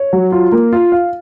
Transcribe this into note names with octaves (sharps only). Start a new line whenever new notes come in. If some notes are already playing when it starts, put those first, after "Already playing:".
Already playing: C#5
F#3
F4
A#3
F4
F5